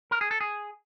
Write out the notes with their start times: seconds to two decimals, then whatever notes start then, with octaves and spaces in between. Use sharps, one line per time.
0.11 A#4
0.21 G#4
0.31 A4
0.41 G#4